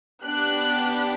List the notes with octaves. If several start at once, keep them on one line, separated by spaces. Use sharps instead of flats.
B3 D4 G4 F#6